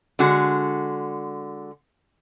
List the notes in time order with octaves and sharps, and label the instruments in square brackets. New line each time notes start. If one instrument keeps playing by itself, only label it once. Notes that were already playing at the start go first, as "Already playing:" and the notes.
[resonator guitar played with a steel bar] D3 G#3 F#4